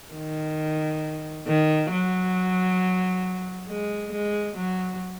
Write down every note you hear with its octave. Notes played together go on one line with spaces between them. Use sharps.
D#3
D#3
F#3
G#3
G#3
F#3